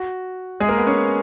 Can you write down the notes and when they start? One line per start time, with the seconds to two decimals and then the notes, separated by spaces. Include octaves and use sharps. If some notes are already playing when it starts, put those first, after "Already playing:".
Already playing: F#4
0.60 G#3 G#4
0.69 A#3 A#4
0.78 B3 B4
0.87 C#4 C#5